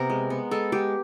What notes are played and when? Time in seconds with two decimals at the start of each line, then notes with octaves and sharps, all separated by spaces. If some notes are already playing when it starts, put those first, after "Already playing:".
Already playing: C3 B3 A#4
0.10 G#3
0.30 B3
0.51 G#3 A4
0.72 G#3 G4